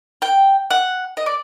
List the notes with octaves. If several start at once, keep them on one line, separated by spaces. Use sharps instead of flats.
G5
F#5
D#5
D5